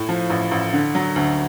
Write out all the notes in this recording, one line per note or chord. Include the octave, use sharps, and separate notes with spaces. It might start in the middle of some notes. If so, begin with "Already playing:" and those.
Already playing: A2
F3
A1
A1
D3
F#3
D2